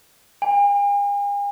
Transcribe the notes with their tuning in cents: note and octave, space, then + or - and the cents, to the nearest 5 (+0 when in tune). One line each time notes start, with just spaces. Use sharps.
G#5 -45